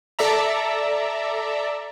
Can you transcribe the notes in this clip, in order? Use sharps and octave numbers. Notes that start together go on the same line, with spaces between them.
A4 D5 E5 A#5